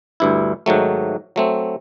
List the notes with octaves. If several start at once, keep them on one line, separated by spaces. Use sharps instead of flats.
D2 G2 E4
G#2 D#3 F#3 A3
F#3 A3 C4